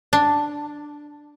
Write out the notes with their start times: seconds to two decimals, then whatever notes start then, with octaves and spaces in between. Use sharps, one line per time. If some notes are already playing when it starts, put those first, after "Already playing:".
0.13 D4